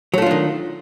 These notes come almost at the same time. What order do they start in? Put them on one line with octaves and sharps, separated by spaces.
F#3 A3 F4 D4 D#3